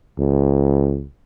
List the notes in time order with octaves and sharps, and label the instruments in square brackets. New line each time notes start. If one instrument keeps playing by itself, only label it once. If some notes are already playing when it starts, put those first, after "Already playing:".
[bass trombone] C#2